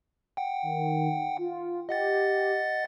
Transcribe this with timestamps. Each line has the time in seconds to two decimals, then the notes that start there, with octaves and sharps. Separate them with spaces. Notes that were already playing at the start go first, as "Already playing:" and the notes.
0.37 F#5 G5
0.63 D#3
1.38 F4
1.89 G4 D#5 F#5 A6